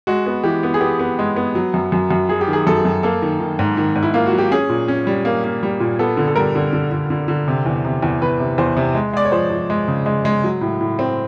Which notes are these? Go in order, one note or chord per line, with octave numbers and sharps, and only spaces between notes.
G#3 F#4
B3
E3 G4
B3
G#4
B3 G4
B3
G#3
B3
F#3
F#2
F#2
F#2
F#3 G#4
G4
D#3
G#4
F#2 A4
F#2
A#3 A4
D#3
D#3
G#2
D#3
G#2
E4
A#3 F4
F#4
F#3
G4
C#4 G#4
A#2
C#4
G3
A#3
A#3
G3
A#2
B3 A4
D3
A4
G3 A#4
D3
D3
D3
D3
D3
C3
E2
C3
E2
E2 B4
C3
E2 C5
C3
G#3
G#3 D5
C#5
F3 C5
F3
G#3
C#3
G#3
G#3
F#3
A2
A2
C4